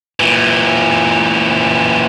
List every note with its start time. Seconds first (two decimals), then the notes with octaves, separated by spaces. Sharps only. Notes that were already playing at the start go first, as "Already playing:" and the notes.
0.20 A#2 E3